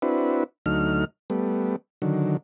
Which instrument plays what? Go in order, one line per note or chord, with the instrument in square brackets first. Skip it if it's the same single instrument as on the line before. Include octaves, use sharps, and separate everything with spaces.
[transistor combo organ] C4 D4 E4 F#4 B4
D2 F#3 A3 D#4 F6
G3 A3 B3
D3 D#3 F#3